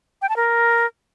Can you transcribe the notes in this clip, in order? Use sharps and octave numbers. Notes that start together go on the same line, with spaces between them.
G5
A5
A#4